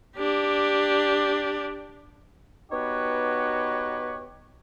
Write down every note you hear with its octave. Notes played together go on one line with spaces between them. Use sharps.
D4 G4
B3 D#4 F#4 G4 B4 C#5